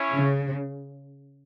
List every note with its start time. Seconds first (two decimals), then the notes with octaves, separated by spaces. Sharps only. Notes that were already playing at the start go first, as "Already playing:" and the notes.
Already playing: C#4 E4 C#5
0.12 C#3